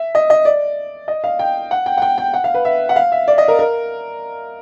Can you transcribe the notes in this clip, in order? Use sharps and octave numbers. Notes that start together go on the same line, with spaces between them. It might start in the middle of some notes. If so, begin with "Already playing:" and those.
Already playing: E5
D#5
D#5
D5
D#5
F5
G5
F#5
G5
F#5
G5
G5
F#5
F5
B4
E5
F#5
F5
E5
D5
D#5
A#4
A#4